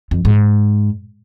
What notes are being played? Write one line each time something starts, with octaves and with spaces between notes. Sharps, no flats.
F2
G#2